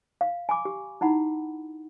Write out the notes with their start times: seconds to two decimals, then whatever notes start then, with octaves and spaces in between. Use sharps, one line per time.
0.21 F5
0.49 G#5 B5 D6
0.65 G4
1.01 D#4 E4 F#5 B5